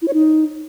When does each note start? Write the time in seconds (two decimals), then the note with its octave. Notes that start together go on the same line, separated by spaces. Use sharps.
0.02 E4
0.08 C#5
0.14 D#4